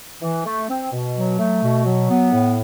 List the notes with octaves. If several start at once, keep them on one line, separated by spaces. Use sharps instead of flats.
E3
A3
C4
B2
F#3
A3
B2
F#3
B3
A2